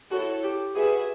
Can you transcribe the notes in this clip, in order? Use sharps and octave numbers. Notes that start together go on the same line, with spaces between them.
E4 F#4 A4 C#5
G4
F#4 G#4 B4 E5 G#5